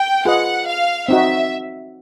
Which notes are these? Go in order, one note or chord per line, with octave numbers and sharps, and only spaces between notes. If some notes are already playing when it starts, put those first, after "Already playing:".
Already playing: G5
F4 G#4 B4 D#5 F#5
F5
C4 D#4 F#4 E5